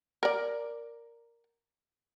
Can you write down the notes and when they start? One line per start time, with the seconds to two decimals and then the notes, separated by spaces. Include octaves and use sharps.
0.23 A#4 D5